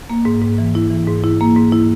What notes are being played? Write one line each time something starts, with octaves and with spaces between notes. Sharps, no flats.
A#3
G#2
G#2
E3
E4
E3
G#2
E4
A#3
G#2
E4